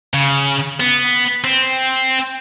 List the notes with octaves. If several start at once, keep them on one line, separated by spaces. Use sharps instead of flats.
C#3
B3
C4